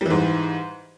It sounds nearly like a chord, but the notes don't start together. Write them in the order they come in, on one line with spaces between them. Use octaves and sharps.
G3 E3 G#2